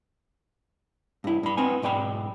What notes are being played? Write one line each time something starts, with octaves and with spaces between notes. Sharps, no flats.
G2 E4
G2 B5
B3 C4 D#4 G#5
B1 G#2 D5 G5 B5